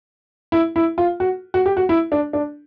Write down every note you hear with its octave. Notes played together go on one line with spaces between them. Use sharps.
E4
E4
F4
F#4
F#4
G4
F#4
E4
D4
D4